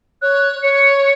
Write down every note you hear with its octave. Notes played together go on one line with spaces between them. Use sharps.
C#5 F#6
C#5 C#7